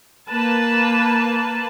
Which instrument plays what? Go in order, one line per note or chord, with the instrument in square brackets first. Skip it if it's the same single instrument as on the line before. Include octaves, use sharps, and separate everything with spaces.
[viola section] A#3 B4 A5